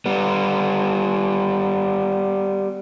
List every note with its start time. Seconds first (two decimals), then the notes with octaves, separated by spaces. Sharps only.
0.06 G3 B3